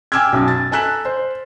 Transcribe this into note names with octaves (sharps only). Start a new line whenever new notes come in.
G5 G#5 D6 E6 F6 G#6
B1 F#2
A6
A4 G#5 A#5 F#6 B6 E7
C5